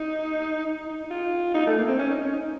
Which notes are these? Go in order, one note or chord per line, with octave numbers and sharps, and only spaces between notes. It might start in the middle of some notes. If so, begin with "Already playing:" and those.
Already playing: D#4
D#4
D#4
D#4
F4
D#4
A3
A#3
C4
C#4
D#4
C#4
D#4
D#4